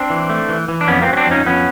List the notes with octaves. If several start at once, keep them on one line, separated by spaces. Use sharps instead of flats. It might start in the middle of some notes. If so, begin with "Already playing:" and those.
Already playing: C4 D4
E3
A3
E3
E3
D4
F2 B3 C#4
A#3 C4
F#3
C#4
C4 D4
F2 C#4 D#4
F2 B3 C#4